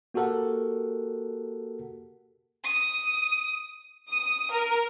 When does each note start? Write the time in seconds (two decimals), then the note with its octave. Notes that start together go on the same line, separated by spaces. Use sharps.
0.14 A#3 F#4 G4 A4 A#4 F#5
2.64 D#6
4.10 D#6
4.51 A#4